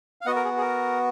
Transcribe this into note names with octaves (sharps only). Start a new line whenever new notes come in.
F5
B3 F#4 D#5 F#5
A#4
G#4
G#4
A#4